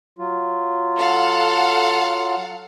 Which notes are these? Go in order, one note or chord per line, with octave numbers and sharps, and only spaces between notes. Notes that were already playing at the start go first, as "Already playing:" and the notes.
F#3 F4
A4 F5 F#5